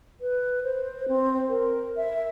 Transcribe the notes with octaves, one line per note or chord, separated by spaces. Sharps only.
B4
C5
C4
A#4
E5